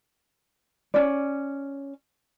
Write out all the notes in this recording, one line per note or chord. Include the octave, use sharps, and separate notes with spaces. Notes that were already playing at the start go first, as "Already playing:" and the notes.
C#4 D5